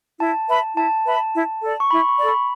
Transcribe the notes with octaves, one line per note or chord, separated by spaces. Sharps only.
E4 A5
B4 E5 B5
E4 A5
B4 E5 B5
E4
A4 D5
C#6
E4 B5
C#6
A4 D5
B5